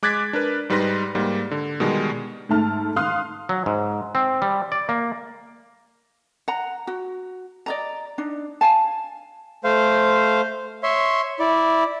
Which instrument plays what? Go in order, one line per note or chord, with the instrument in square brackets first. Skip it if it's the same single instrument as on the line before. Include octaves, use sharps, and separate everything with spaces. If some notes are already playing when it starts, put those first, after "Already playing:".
[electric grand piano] G#3 D6 F#6 G#6 A6 B6
D4 A#4 B4
G#2 G3 D#4 B4 C6 A#6
G#2 G3 A#3
D3
B2 D#3 G3 G#3
[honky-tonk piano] G#2 A3 A5 F6
F5 C6 D#6 F6 F#6
[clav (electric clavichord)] F#3
G#2
C4
G3
D5
A#3
[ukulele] F#5 A#5
F#4
D5 D#5 A#5
D4 D#4
F5 G#5 A5
[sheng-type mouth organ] A3 C5 F5
C#5 E5 C6
E4 D5